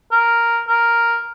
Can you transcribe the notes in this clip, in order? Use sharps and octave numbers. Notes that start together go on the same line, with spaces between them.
A#4
A#4